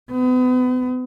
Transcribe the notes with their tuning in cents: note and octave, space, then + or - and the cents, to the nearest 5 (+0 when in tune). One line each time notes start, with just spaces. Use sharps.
B3 +35